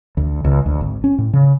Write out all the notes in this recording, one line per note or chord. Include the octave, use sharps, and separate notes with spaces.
D2
C#2
D2
G#1
C#4
A2
C#3